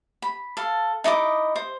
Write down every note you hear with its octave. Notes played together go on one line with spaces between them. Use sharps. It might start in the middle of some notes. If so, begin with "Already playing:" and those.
B5
A4 F5
D#4 E4 D#5 D6
C5